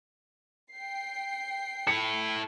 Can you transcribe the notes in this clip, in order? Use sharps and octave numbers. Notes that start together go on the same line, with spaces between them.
G5 C7
E4 A4 C#7